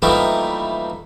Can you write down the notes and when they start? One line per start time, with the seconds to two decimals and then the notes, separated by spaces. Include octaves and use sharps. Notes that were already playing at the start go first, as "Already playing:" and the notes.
0.02 E3 F3 G3 A3 A#3 D#4